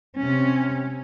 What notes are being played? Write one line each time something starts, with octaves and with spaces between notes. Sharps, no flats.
C3 C#4